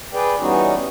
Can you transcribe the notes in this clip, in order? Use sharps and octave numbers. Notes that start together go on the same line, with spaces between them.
G#4 B4 D5 G5
E3 G3 B3 C#4 D#4 F#4